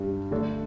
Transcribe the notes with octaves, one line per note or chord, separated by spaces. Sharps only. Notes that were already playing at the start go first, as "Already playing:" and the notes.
Already playing: G2 G3 D4 G4
D3 A3 D4 A4